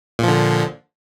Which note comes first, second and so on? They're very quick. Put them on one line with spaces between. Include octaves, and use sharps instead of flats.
A#2 F3 D3